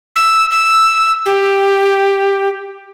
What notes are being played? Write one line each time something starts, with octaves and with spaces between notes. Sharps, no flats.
E6
E6
G4